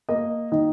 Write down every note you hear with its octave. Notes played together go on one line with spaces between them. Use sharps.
A#3 D#5
D#3 D#5